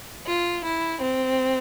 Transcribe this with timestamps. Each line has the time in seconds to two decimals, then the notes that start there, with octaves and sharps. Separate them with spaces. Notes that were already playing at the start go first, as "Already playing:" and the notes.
0.27 F4
0.64 E4
1.01 C4